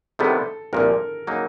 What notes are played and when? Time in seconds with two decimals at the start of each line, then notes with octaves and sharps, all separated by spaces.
0.19 C3 D#3 G3 B3 E4 A4
0.73 C2 A#2 F3 A#4
1.27 C#3 F#3 A#3 D#4